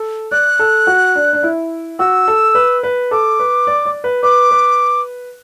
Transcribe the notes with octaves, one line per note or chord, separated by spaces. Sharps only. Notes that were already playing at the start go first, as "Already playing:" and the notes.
Already playing: A4
D5 F#6
A4
F#4
D4
D4
E4
F#4 E6
A4
B4
B4
A4 D6
B4
D5
D5
B4
B4 D6
B4